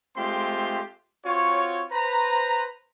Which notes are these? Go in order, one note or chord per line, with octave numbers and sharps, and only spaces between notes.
G#3 A3 C4 F4 G4 C6
C4 F4 F#4 C#5
B4 C5 A#5